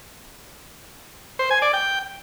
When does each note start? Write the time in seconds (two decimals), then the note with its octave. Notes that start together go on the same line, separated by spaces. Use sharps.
1.39 C5
1.51 G#5
1.62 D5
1.73 G5